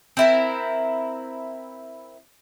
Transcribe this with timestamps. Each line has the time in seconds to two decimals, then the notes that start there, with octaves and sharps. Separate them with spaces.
0.17 C4 E4 A#4